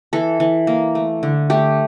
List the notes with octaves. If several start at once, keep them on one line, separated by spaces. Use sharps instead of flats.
E3 A4
E3
A#3
A3
D3
A3 G4